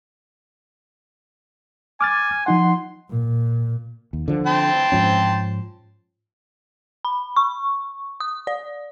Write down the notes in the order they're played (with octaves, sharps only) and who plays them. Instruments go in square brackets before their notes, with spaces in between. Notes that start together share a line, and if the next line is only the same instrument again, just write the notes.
[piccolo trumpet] G#5 [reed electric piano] D6 F6 A6
[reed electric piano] F3 D#4 F#5 [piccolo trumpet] C6
[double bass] A#2
[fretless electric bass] D#2
D3 F3
[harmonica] G5 A5 C6
[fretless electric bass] G#2 F3 C#4
[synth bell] B5
C#6
D#6
D5